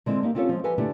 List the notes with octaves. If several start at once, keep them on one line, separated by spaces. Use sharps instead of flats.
D3 G#3 C4 E4 A4
A#3 D#4 G4
C4 C#4 F4 G4 A4 C#5
F3 G#3
G4 A4 B4 D#5 G#5
D3 A3 D4 E4 G4 A4